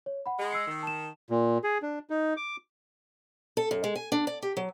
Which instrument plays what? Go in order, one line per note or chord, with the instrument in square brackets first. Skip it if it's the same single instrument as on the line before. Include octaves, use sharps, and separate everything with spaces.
[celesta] C#5
F#5 B5
[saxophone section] G#3
[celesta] E6 C7 C#7
[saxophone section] D#3
[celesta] A5 E7
[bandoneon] A#2
G#4
D4
D#4
D6
[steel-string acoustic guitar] A4
F#2
G#3
G#5
D4
D5
G4
F#3